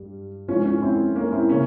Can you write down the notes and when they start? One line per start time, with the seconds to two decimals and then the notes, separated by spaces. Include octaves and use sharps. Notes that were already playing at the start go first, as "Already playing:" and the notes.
Already playing: G2 G3
0.48 F3 C#4 F4
0.51 G#2
0.65 C#4 F4
0.82 C4 E4
1.15 A#3 C#4
1.32 C4 E4
1.49 C#3 A#3 C#4